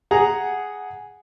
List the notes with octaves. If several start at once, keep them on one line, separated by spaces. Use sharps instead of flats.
G#4 F#5 A#5